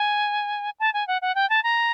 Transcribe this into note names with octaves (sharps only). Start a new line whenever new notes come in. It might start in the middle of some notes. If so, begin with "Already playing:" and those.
Already playing: G#5
A5
G#5
F#5
F#5
G5
A5
A#5